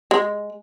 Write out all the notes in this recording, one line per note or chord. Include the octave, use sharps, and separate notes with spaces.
G#3